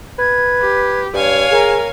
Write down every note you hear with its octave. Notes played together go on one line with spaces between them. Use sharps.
B4 G#6
G4
G2 C#5 F5 G#5
G#4 A#4